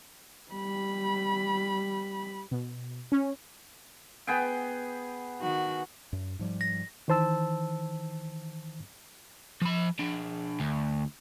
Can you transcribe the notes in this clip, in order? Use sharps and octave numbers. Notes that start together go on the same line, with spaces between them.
G3 B5
B2
C#4
B3 G#4 G5
D#3 F#4
F#2
G#2 F3 G3
A#6
D#3 E3 C5 A5 E6
F3 B5
D4 G#4
D2